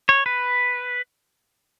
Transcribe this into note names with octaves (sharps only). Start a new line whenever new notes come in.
C#5
B4